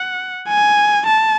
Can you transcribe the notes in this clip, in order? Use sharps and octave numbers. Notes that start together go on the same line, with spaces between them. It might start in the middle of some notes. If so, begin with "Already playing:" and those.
Already playing: F#5
G#5
A5